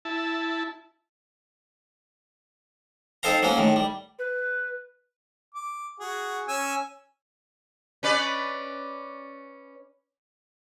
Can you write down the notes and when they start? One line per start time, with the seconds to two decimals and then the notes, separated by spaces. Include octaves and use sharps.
0.05 E4 A5
3.23 C4 D#4 A4 C5 F5 A#5
3.43 F#3 A#3 C#4 F#4
3.57 A2 D#3
3.76 G3
4.19 B4
5.54 D6
6.00 F#4 G#4 F#5
6.48 C#4 G#5 E6
8.03 C#4 B4 D5